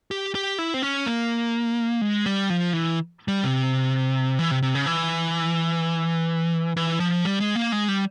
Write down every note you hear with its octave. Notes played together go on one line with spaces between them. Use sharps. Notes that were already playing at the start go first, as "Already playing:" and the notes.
G4
G4
E4
C4
C#4
A#3
G#3
G3
F3
E3
G3
C3
E3
C3
C3
C#3
E3
E3
F3
G3
G#3
A#3
G#3
G3